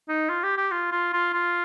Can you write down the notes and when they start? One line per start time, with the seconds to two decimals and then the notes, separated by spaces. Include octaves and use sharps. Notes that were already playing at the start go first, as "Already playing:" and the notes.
0.09 D#4
0.29 F4
0.43 G4
0.57 G4
0.71 F4
0.92 F4
1.13 F4
1.33 F4